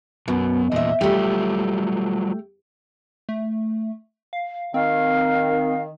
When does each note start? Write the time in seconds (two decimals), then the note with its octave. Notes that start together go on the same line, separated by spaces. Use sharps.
0.28 F#2 B2
0.72 E2 A#2 D#5 E5
1.01 F#3 G3 A3 F4 G4
3.29 A3
4.33 F5
4.74 D#3 C4 F5